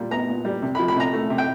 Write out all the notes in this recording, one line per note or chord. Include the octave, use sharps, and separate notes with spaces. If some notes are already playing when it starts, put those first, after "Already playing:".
Already playing: A#2 G3
B3 A#5
A#2
G3
C3
B5
F3
B5
C3 A#5
A3
C3
G5